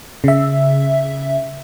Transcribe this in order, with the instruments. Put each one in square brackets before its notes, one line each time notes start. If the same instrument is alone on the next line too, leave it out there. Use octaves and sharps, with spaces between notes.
[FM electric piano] C#3 E5